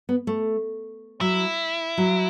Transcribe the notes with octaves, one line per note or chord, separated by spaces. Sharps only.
B3
A3
F#3 E4
F#3